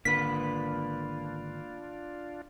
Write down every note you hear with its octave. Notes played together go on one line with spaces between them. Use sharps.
G#1 D3 A#3 D4 F4 B4 B6